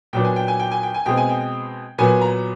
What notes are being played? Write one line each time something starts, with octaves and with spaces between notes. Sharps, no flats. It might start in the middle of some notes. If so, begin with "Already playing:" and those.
A#2 F#3 B3 D4 G5
G#5
G5
G#5
G5
G#5
G5
G#5
B2 G#3 C4 G5
G#5
G5
A#2 F#3 B3 G#5
A#5